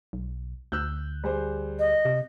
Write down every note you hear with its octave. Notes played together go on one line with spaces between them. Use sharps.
B1
D2 E6 F#6 G6
G3 G#4 C5
D#5
C3